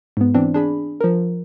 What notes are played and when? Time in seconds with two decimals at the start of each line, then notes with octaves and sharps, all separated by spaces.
0.17 G#2 B3
0.34 E3 C4 D4
0.54 D4 G#4 B5
1.01 F3 A#4